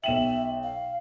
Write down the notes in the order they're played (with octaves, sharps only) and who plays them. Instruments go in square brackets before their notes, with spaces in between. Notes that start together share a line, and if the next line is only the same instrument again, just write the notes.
[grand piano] B1 E7 F#7 [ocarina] E5 [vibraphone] G5
[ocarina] F5